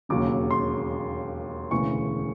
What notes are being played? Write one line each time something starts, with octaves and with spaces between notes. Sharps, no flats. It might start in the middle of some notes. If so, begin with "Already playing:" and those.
E1 D#2 C#3 F#3 D6
C6
E1 D2 C#3 E3 C#6